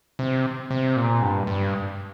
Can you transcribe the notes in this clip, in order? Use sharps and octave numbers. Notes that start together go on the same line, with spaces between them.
C3
C3
A#2
G2
G2